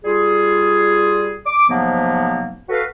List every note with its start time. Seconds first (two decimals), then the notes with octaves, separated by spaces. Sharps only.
0.05 G3 F4 G#4
1.46 D6
1.69 G#2 C3 F3 F#3 A#3 B3
2.69 F#4 A4 B4 F5